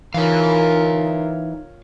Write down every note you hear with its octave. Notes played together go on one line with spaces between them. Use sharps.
E3 D#4 F4 A#4 C#5 F5